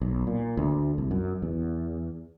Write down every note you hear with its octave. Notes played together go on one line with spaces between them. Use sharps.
B1
A#2
D2
C2
F#2
E2